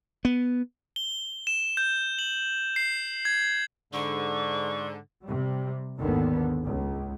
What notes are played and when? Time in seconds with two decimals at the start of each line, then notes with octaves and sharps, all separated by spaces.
0.25 B3
0.96 G7
1.47 E7
1.77 G6
2.19 F#7
2.76 C7
3.25 G#6
3.93 G#2 D3 C#6
5.24 C3 G3
5.97 G#1 D#2 D3 D#3 B3
6.65 C#2